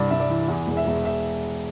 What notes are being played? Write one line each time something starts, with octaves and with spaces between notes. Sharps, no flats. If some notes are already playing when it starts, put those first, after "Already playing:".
Already playing: C2 G2 D5
G2 E5
D5
E3
E2
E1
E5
E1
E5